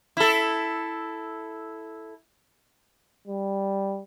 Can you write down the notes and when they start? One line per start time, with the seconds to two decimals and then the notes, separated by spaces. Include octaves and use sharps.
0.17 E4 A4
3.27 G3